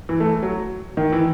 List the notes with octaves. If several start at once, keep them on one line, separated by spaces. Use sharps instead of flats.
E3
A3
F#3
D#3
E3